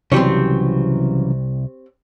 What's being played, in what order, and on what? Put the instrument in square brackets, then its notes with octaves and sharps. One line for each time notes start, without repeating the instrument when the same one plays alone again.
[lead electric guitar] C2 [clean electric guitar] C#3 E3 F#3 [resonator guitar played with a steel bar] C4 G4 C#5